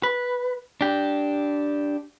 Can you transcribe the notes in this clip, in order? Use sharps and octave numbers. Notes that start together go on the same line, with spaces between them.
B4
D4 G4